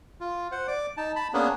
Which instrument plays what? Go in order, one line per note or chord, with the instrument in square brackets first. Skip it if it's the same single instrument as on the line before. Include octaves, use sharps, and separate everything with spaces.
[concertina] F4
C5 F#5
D5 D6
D#4 A5
A5 B5
A#3 B3 C#4 D4 G#4